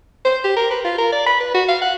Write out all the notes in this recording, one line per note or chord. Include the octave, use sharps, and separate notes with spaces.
C5
G4
A#4
B4
F4
A#4
D5
B5
B4
F#4
F5
F#5